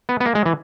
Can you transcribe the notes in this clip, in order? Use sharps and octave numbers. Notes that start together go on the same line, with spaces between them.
B3
B3
A#3
G#3
E3